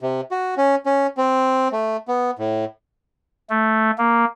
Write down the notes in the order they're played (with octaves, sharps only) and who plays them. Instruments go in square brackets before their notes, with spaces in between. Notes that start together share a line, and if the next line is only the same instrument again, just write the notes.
[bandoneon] C3
F#4
C#4
C#4
C4
A3
B3
A2
[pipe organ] A3
A#3